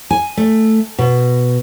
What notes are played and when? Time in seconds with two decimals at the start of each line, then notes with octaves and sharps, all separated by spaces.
0.11 G#5
0.37 A3
0.99 B2